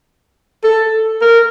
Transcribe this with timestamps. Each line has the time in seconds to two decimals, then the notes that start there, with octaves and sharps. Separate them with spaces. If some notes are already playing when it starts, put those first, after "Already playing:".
0.64 A4
1.21 A#4